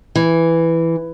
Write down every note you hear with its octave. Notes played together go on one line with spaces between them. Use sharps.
E3